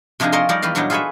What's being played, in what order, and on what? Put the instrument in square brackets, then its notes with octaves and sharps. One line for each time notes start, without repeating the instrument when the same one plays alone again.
[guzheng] C3 F3 A#3 D4 D#4 G#4
A#4 C#5 D#5 A5 A#5 C6
F3 G3 D#4 A#4 C#5 D5
E2 G4 B4 F5
A#2 F#3 G3 D4 D#4 A#5
F4 G#4 A4 B4 C#5 E5